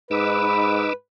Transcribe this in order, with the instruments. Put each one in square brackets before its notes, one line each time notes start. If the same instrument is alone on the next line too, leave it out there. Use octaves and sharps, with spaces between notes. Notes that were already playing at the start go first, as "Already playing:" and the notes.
[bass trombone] G#2 [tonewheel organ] D#4 D6 E6 [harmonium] B4